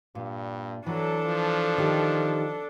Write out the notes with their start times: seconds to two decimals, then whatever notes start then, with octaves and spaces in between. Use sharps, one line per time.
0.15 G2 A#2
0.86 E3 F#3 D4 A4
1.26 F3
1.78 D#3 G4